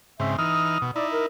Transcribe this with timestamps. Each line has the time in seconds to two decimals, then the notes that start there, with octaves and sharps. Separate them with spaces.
0.20 G#2 C#3 C4 E5
0.38 E3 D#4 D#6 F6
0.82 B2
0.96 D#4 E4 D5
1.13 A#4